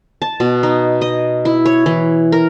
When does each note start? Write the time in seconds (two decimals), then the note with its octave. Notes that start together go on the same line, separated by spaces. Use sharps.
0.22 A5
0.40 B2
0.63 D#4
1.01 D#5
1.45 E4
1.65 C#5
1.86 E3
2.32 A#4